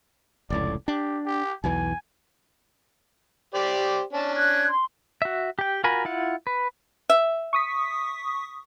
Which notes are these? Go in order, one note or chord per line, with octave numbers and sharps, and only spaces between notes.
F1 C#2 A2 D5
D4 G4
G4
B1 E2 E3 G#5
G4 C5 D5
C#4 D4 A5
F#6 G#6
C6
F#4 E5
G4 G5
F4 F#4 A#4 G#5 B5
E4 F4 F#5
B4
E5
C#6 D#6 B6